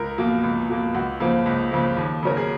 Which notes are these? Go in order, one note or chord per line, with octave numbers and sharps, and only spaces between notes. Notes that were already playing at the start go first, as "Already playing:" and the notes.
Already playing: C#2 A#4
B2 A#3
C#2
B2 A#3
C#2 F#4
C#3 F3 A#3
C#2
C#3 F3 A#3
D#2
C#3 F#3 C#4 A#4
G#4